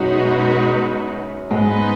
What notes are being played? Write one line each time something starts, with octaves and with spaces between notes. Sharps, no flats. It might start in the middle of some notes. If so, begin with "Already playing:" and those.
Already playing: F#2 B2 F#3 G#3 D#4 F#4 B4
G#2 F#3 G#3 B3 D#4 B4 D#5